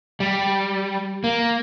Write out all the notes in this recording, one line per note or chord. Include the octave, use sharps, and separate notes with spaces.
G3
A#3